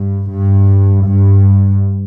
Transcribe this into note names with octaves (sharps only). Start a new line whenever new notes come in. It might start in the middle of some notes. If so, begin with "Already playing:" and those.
Already playing: G2
G2
G2